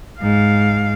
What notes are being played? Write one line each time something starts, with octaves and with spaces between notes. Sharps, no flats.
G#2 F5